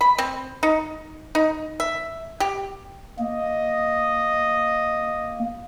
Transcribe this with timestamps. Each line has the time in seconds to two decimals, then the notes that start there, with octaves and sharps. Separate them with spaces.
0.01 B5
0.18 C4
0.63 D#4
1.35 D#4
1.80 E5
2.40 G4
3.19 A#3 D#5